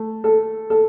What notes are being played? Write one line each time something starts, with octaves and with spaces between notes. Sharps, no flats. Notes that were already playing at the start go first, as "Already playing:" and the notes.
Already playing: A3
A4
A4